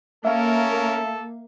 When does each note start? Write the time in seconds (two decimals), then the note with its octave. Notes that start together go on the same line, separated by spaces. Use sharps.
0.25 A#3 C#4 A4 A#4 E5 F5